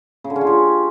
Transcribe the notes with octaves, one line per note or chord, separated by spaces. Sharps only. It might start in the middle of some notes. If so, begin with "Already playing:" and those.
C#3
D3
C#4
F4
G4